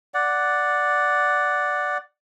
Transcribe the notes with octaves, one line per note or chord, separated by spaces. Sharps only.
D5 F#5